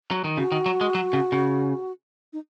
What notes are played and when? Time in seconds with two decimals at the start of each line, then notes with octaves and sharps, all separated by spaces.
0.11 F#3
0.24 D#3
0.37 C#3 F#4
0.52 D#3
0.66 F#3
0.81 G#3
0.95 F#3
1.13 C#3
1.32 C#3
2.33 D#4